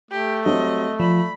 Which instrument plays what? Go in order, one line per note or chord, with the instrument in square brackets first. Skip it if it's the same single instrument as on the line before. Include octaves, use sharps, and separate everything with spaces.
[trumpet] A3 [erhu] G4
[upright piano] F#3 G3 C4 [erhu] D#5
[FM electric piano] F3 [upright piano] D5 [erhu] B5